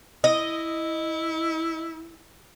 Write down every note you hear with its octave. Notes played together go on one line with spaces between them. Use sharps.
E4 D#5